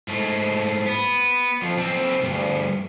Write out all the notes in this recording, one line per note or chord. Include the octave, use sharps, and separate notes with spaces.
G#2 A3
B3
F2 F3
B1 C4
D2 G2